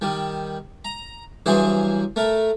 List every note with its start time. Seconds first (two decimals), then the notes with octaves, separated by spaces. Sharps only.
0.01 D#3 G3
0.85 A#5
1.46 G2 E3 F#3 G#4 C5 G#5
2.16 A3 A#4